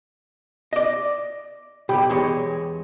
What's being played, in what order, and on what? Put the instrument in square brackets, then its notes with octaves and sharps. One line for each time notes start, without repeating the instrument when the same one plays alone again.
[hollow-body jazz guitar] D5 D#5
[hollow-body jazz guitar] B1 [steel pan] G4 G5 B5
[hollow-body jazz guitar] E2 G#3 C#5